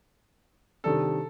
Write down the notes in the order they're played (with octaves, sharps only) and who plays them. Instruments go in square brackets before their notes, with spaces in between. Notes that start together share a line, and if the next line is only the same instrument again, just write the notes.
[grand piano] C3 D#3 G3 D4 [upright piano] A4